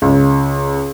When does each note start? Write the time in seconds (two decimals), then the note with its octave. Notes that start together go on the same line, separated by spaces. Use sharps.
0.02 C#2